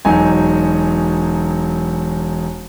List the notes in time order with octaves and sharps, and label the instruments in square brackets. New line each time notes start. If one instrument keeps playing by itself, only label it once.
[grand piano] E1 F#3 D#4 G#5